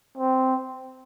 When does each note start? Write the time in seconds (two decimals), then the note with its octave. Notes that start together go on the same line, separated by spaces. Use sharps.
0.18 C4